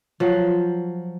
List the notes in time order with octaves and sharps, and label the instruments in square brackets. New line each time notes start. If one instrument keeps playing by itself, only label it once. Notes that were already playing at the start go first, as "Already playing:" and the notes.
[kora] F3 F#3